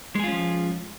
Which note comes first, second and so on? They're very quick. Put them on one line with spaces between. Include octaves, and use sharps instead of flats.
G#3 G#4 F4 C#4 F3